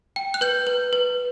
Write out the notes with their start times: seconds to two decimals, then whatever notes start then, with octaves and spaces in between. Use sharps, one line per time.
0.16 G5
0.34 F#6
0.41 B4 G6
0.67 B4
0.93 B4